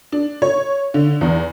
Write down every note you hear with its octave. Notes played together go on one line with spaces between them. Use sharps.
D4
C#5
D3
E2